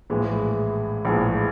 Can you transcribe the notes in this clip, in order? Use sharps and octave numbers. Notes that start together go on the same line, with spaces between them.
A#1 A2 E3 G#3
A#1 A2 E3 G#3